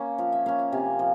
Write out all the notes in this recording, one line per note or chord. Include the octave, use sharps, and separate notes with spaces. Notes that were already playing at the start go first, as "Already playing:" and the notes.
Already playing: A#3 C#4
F3 F5
E5
A#3 C#4 F5
F5
C3 G#5
F3